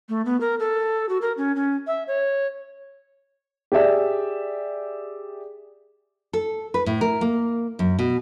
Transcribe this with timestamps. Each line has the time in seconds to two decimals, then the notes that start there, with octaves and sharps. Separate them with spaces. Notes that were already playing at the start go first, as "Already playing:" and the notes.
0.09 A3
0.25 B3
0.41 A#4
0.59 A4
1.09 F#4
1.22 A#4
1.37 C#4
1.56 C#4
1.87 E5
2.08 C#5
3.72 G4 G#4 D5 E5
6.33 A4
6.74 B4
6.86 A2
7.01 A#4
7.21 A#3
7.79 F#2
7.99 B2